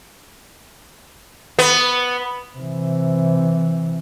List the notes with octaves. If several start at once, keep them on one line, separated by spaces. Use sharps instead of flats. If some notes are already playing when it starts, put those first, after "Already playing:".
B3
C3 E3